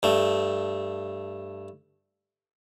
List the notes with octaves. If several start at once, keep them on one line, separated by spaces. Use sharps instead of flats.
G2 A3